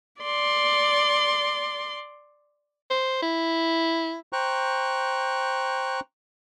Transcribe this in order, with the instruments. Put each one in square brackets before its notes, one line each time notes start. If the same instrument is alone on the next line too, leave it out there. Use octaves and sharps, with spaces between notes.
[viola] D5 C6
[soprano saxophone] C5
E4
[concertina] C5 G5 A#5 C#6 F#6